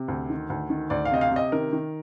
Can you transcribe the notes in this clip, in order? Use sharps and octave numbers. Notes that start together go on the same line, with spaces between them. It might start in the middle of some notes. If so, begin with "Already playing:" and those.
Already playing: C3
D2
D#3
D2
D#3
D2 D5
F5
C3 D#5
F5
C3 D#5
D#3 A#4
D#3